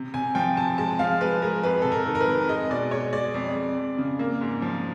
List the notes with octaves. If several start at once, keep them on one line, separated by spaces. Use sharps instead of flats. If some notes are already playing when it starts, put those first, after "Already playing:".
Already playing: C3
C3 G#5
F3 G5
C3 A5
G#3 A5
F3 F5
G#3 B4
G#3 A#4
F2 B4
C3 A4
A#4
D#3
A#4
B4
F2
G#3 D#5
B2 D5
G#3 C#5
G#3 D5
F2
F2
F2
C#3
A#3
G#2
F3